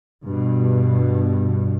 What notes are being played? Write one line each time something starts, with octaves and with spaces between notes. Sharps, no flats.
G2 B2